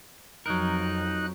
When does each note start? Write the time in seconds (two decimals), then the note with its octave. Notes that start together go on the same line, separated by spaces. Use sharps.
0.46 F2 F#3 D#4 A#4 F#6